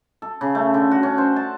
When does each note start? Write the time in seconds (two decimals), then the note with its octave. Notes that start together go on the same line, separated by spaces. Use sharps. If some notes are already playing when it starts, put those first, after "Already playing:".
0.22 A4
0.41 C#3
0.55 A3
0.74 D3
0.91 F#4
1.03 C#4
1.18 C5
1.36 A5